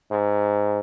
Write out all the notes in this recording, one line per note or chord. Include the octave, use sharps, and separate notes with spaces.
G#2